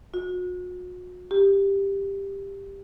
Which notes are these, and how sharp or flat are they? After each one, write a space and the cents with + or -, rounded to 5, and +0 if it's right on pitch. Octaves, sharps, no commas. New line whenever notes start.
F#4 -40
G4 +10